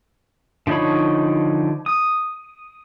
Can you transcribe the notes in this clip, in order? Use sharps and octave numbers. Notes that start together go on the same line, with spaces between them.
D3 F3 D#4 C#5 B5
D#6